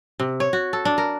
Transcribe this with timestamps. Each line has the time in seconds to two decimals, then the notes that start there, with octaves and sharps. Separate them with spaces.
0.20 C3
0.40 C#5
0.53 F#4
0.73 A4
0.85 D4
0.98 A#4